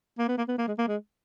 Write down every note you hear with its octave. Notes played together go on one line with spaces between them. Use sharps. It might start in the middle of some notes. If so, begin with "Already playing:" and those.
A#3
B3
A#3
B3
A#3
G#3
A#3
G#3